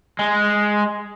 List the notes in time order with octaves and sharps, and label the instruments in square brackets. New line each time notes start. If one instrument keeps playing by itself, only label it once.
[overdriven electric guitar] G#3